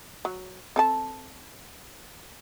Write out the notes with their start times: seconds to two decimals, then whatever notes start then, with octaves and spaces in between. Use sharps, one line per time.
0.25 F#3
0.76 C4 A4 A5